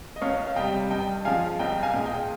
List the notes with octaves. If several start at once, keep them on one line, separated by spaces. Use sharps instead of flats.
D#5
C#2 C#5 F5
F5
C3 G3 D#5 G5
G2 D#5 G5
F3 G#3 F5 G#5
C2 D#5 G5
F5 G#5
A#2 G#3
D#5 G5